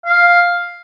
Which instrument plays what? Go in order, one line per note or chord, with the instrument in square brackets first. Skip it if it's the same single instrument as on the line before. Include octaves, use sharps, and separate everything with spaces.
[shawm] F5